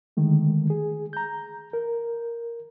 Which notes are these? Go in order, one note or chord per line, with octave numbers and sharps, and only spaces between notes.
D3 D#3 G#3 A3
G#4
A#5 G6
A#4